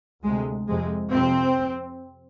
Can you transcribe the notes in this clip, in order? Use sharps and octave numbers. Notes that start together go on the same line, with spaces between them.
D2 C3 G#3
F2 C3 G#3
F2 C3 C4